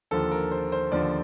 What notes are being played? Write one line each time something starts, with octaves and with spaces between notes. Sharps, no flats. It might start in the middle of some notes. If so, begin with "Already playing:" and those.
D#2 D3 F3 A4
A#4
C5
C5
D#2 D3 F3 D5